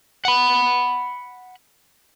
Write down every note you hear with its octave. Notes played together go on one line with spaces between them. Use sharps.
F#5 B5